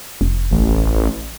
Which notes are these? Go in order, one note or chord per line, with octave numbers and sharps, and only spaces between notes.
F1
A1